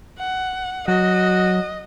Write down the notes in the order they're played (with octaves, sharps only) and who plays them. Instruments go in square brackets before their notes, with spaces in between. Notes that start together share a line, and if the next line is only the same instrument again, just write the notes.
[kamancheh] F#5
[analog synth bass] F#3 [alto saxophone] F#4 [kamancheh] D#5